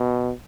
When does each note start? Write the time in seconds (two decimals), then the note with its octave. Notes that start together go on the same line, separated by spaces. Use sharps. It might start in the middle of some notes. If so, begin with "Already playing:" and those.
Already playing: B2